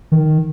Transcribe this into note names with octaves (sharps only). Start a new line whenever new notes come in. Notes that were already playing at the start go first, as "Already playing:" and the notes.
D#3